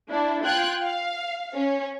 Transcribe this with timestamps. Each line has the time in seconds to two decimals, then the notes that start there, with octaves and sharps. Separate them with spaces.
0.10 D4 E4
0.45 F4 G5 F#6 G#6
0.82 F5
1.55 C#4